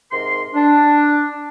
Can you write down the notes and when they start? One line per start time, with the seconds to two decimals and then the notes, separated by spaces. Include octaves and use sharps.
0.12 G#2 C3 A#4 C6
0.55 D4